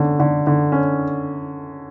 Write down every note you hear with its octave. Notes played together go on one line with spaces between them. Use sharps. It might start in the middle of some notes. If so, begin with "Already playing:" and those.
Already playing: D3 C#4
D3
D3
C#4